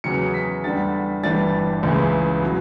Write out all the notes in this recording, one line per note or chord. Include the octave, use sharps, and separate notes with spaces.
E2 C#3 F#3 C#7
B6
E2 D3 G3 A6
G1 G2 E3 G3 A6
C#2 C#3 E3
B2 F#3